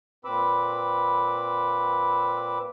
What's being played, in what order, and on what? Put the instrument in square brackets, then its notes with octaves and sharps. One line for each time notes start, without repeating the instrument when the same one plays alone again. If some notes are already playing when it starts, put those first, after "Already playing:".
[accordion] A#2 C4 B4 B5 D6 E6